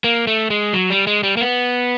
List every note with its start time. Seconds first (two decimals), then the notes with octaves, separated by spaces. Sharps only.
0.04 A#3
0.27 A3
0.50 G#3
0.73 F#3
0.90 G3
1.07 G#3
1.23 G3
1.37 A#3
1.41 B3